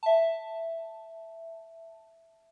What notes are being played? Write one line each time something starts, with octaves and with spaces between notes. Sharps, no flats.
E5 A5